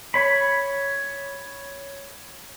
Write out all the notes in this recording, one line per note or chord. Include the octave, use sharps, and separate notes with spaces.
C#5 B5